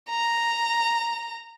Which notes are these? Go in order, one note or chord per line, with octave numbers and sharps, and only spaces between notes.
A#5